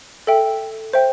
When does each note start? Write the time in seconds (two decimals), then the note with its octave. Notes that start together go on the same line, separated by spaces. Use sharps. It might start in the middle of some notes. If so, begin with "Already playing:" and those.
0.27 A4 E5 G5
0.93 C5 E5 G5